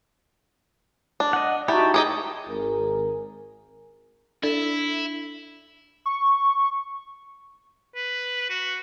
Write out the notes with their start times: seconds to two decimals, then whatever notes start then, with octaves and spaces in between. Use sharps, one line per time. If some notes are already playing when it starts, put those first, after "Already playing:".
1.20 D4
1.33 D#5 F#5
1.68 D#4 E4 F#4 G4 G5 A5
1.94 D#4 G4 G#4 A#4 D5 D#5
2.47 G#1 G#4 A#4
4.43 D4 E4 A4
6.06 C#6
7.95 B4
8.50 F#4